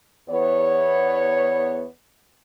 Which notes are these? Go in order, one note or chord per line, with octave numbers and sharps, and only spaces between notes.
E2 B3 C#5